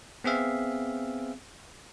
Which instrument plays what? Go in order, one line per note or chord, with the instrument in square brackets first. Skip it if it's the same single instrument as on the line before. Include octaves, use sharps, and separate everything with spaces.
[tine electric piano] B3 C4 G#4 E5 F5